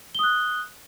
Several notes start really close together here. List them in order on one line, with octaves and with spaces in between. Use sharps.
G7 D#6 F#6